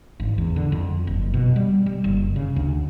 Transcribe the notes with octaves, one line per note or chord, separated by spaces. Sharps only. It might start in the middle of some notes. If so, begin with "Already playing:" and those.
G#1
E2
D3
F2
F#1
B2
G3
G3
F#1
C#3
D2